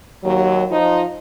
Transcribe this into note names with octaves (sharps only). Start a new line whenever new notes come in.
D#2 F#3
F3 D#4 F4